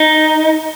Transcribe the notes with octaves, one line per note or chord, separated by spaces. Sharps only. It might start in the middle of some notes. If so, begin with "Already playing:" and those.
Already playing: D#4